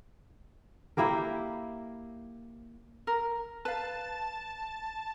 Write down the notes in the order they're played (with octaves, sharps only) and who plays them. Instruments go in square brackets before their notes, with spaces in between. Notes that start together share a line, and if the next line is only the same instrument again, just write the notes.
[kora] A#3 E4 G4 A#4
[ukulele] A#4
[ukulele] B4 F5 [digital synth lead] A5